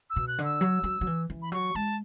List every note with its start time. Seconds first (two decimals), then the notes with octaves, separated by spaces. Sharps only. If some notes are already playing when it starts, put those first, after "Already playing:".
0.10 E6
0.16 B2
0.28 F#6
0.39 D3
0.44 E6
0.61 F#3
0.84 F#3
1.01 F#3
1.07 E3
1.30 E3
1.42 B5
1.52 F#3 C#6
1.75 G#3 A5